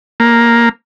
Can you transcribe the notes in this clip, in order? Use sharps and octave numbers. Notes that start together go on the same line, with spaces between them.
A#3